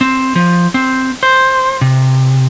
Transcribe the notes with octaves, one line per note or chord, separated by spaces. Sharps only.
C4
F3
C4
C5
C3